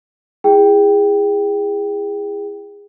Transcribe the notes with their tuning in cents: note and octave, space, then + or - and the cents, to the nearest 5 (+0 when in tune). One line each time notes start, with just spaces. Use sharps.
E4 +15 G#4 -25 G5 +0